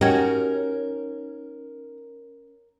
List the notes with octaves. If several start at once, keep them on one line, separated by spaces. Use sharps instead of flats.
C#4 D#4 F#4 G4 A#4 G5 G#6